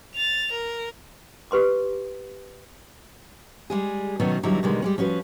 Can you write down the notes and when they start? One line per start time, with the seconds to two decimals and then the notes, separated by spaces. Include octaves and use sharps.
0.15 A6 F7
0.51 A#4
1.51 G4 B4 C6 D6
3.70 G3 G#3 G#4
4.20 B2 D#3 F#3 A3 B3 C#4
4.43 E2 D3 F#3 G3 D#4 E4
4.63 B2 D3 D#3 G3 G#3
4.82 G3 G#3 C#4
4.98 F3 C#4 F#4 B4